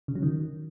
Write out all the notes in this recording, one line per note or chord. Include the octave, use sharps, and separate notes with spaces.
C#3
F#3
D#3